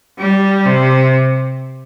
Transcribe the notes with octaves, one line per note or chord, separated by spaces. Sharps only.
G3
C3